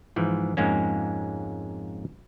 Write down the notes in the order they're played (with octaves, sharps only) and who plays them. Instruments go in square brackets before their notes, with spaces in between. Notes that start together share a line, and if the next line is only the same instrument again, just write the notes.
[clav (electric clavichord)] G#2 E3 F3
F2 G#2 G#3 A#3 C#4